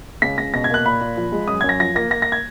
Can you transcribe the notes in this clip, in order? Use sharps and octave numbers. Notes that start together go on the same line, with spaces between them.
C#2 B6
C#2 A#6
B2 A#6
G#6
A#3 F#6
A#2 B5
A#2
F3
G#3
F#2 D#6
F#2 G#6
A#6
F3 A#6
A#3 A#6
A#3 A#6
A#6
G#6